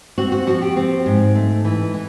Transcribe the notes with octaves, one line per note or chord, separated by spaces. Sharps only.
C4 F#4
F#4
F3 F#4
G4
C4
G#2
A3
E3
E3